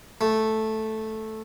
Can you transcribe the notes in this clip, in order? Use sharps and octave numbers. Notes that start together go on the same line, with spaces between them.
A3